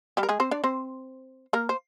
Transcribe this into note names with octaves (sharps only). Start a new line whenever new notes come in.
G3 G4
A#4
G#3 G#4
C4 C5
D4 D5
C4 C5
A#3 A#4
C5